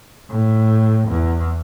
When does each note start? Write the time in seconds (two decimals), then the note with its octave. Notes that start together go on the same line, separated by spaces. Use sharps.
0.30 A2
1.08 E2